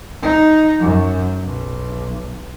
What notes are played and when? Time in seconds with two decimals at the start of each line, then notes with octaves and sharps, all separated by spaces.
0.23 D#4
0.80 F#2
1.43 B1